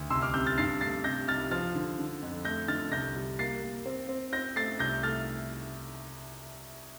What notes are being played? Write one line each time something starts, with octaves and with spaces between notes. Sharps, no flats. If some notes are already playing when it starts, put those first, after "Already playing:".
Already playing: D2
C2 C6 E6
D6 F6
C3 E6 G6
F6 A6
G2 A6 C7
A3 A6 C7
C3 G6 A#6
C2 F6 A6
F3 F6 A6
D3
D3
F2
A3 G6 A#6
D3 F6 A6
C2 G6 A#6
G3
A#3 A6 C7
A#3
C4
C4
C4 G6 A#6
A3 A6 C7
C2 G6 A#6
A3 F6 A6